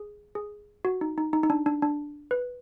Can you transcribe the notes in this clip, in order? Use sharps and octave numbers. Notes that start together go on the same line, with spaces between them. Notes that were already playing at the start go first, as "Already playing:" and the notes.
Already playing: G#4
G#4
F#4
D#4
D#4
D#4
D#4
D4
D4
D4
B4